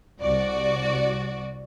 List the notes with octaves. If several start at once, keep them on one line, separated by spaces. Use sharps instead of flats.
C2 F#4 D5